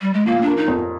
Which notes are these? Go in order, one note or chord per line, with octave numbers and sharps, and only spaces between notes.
G3
G#3
F3 A#3
A#3 D4
D#4
F2